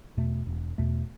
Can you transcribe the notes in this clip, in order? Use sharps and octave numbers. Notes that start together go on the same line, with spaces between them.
E2 B2 A3
E1
E2 B2 A3